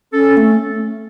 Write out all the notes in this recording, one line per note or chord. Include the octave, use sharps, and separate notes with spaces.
C#4 A4
A3